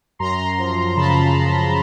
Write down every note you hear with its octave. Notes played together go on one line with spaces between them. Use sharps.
F#2 A#5 C6
F3
C#3 A5 B5
F#2